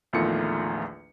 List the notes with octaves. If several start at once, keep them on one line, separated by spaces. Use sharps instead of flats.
A#1 E2 D#3 A3 F4 C#7